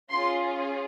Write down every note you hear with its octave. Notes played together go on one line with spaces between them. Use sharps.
C#4 F4 G#4 C6